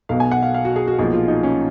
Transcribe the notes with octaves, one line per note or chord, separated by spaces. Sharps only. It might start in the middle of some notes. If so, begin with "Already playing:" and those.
B1 B2 F5
G#5
F#5
F5
F5
F#4
G#4
F#4
B1 A#2 F3 G#4
F4
D#4
C#4